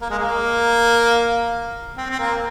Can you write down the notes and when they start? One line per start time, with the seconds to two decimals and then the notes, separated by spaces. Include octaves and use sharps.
0.01 A#3
0.10 G#3
0.19 A#3
1.98 C4
2.10 C4
2.19 A#3